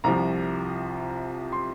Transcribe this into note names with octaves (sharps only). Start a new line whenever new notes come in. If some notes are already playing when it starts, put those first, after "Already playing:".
C2 C3 F3 A#5
C6